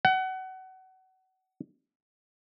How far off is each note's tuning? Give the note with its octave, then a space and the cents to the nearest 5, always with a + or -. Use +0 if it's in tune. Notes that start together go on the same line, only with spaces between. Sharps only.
F#5 +25